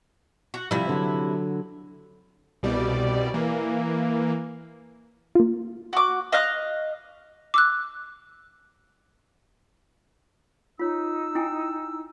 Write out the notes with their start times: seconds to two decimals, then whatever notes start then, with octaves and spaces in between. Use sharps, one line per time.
0.54 F#4
0.71 C3 F3 G3 E4
0.89 D3 F#3
2.63 C2 B2 G3 D5
3.34 E3 A#3
5.35 A#3 F4
5.93 F#4 D6
6.32 D#5 F5 F#6
7.54 D6 E6 F#6
10.79 D#4 F4 C#5 E6
11.35 E4 G5 G#5